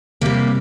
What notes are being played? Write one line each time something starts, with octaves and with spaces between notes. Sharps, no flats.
C3 G3 A#3